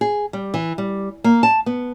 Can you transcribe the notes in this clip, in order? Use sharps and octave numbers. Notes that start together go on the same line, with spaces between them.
G#4
G3
E3
G3
A#3
A5
B3